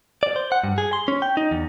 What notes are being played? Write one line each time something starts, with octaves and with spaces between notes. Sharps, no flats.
D5
C5
F#5
G2
G#4
C6
C#4
G5
D#4
E2